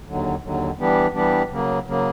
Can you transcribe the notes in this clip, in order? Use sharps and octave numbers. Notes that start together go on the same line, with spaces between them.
D#2 D3 F#3
D#2 D3 F#3
E3 G3 B3 D4 G4
E3 G3 B3 D4 G4
C#3 F#3 A#3
C#3 F#3 A#3